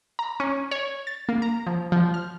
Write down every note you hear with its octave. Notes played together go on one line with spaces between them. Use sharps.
A#5
C#4
C#5
A6
A#3
A#5
F3
F3
F6